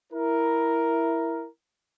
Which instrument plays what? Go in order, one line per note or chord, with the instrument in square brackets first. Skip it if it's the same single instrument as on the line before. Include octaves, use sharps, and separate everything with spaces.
[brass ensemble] E4 A#4